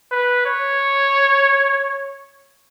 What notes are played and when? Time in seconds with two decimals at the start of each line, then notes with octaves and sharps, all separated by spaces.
0.12 B4
0.46 C#5